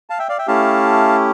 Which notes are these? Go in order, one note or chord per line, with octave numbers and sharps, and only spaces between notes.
F5 A5
E5 G5
D5 F5
E5 G5
A3 C#4 E4 G4 F5 A5